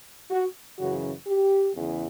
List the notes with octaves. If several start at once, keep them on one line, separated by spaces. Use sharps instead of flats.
F#4
F#2 C#3 E3 F#4
G4
E2 C#3 E3